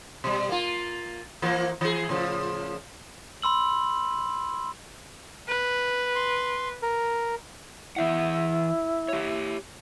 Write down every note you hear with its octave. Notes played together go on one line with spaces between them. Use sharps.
B2 G3
A#3 F4
E3 F3 A#3
E3 G#4
A2 C#3 F3
B5 C6 E6 F#7
B4
C6
A#4
E3 E4 E5 F#5
G4 C#5